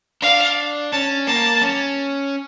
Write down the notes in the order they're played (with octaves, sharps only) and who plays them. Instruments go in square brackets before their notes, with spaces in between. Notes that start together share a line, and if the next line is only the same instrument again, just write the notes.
[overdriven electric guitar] D4 [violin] F5
[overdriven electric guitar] C#4 [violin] A5
[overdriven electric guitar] A#3 [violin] A5
[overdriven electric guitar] C#4